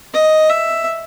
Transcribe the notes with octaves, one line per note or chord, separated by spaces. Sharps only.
D#5
E5